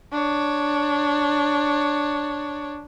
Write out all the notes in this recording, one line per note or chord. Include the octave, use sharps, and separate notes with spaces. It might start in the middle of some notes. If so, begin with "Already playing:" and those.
D4 C#5